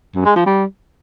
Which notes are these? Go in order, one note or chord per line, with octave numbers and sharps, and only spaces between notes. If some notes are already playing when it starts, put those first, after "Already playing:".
F#2
G#3
F3
G3